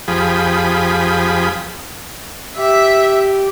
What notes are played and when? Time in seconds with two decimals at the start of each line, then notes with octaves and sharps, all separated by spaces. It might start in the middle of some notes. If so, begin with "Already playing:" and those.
0.08 F2 F3 G4 G#4 B5 D#6
2.57 G4 E5